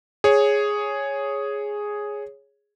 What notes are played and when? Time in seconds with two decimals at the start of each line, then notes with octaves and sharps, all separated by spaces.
0.24 G#4 C#5